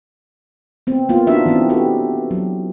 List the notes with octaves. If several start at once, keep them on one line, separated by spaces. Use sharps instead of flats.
B3 C4
A#3 B3 F4
D4 D#4 F#4 E5
E3 B3 C4
C4 F#4 G4 A4
F#3